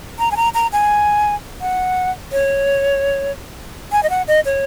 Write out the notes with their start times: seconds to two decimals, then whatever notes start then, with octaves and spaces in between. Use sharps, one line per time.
0.19 A#5
0.32 G#5
0.36 A#5
0.54 A#5
0.73 G#5
1.61 F#5
2.32 C#5
3.92 G#5
4.03 D#5
4.10 F#5
4.28 D#5
4.45 C#5